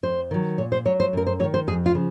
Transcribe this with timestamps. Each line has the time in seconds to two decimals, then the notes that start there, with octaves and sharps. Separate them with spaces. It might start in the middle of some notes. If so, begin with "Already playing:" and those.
0.03 F2 C5
0.31 D#3 F#3
0.58 A#2 C#5
0.72 C5
0.85 F#3 C#5
1.00 C5
1.13 F#2 A#4
1.27 C5
1.40 F#3 C#5
1.44 D#3
1.54 C5
1.67 F2 G#4
1.86 F4
1.94 C#3 F3